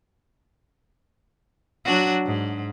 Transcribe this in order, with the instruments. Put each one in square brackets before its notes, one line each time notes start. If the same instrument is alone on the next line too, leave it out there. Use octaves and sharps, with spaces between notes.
[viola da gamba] F#3 D4 F#4
G#2